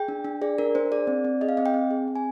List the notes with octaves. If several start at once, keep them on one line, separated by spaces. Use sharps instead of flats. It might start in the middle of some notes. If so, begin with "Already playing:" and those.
Already playing: G#4 G5
D4
D4
G#4 D5
D4 A#4
D4 C5
G#4 D5
C4
C4
G#4 D#5
F5
C4 D#5
G5
C4
G#4
C4
G#5